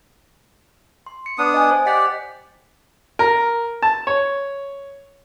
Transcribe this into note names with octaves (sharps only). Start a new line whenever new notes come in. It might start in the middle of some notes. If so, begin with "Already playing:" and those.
C6
C#7
B3 D4 D#6
D#5 G#5
C5
G4 D5 D#5 F#5 B6
A#4
A5
C#5